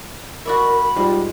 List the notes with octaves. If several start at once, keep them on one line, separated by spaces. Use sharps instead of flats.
F#4 A#4 D5 E5 B5
G#2 G3 F4